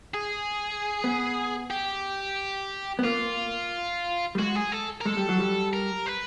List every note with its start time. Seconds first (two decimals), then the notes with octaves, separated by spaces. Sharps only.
0.14 G#4
1.04 B3
1.71 G4
2.99 B3
3.04 A#3 F4
4.35 G3
4.39 G#3 F#4
4.56 G#4
4.72 A4
5.01 A#4
5.06 G#3 A4
5.17 G3
5.29 F#3
5.40 G3
5.73 A#4
6.07 B4